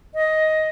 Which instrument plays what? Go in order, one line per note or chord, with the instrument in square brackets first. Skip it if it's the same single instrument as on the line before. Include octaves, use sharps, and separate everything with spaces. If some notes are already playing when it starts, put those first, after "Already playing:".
[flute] D#5